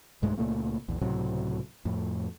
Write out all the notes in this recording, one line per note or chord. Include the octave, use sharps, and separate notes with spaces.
B1 G2 G#3 A3
C#2 A#2 A3 A#3
A#1 E2
C#2 A2 C3 F#3
F2 A2